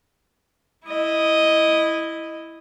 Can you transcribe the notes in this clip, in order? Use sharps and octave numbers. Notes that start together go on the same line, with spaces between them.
E4 D#5